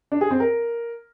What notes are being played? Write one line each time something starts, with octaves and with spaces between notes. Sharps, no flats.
D4
G#4
C4
A#4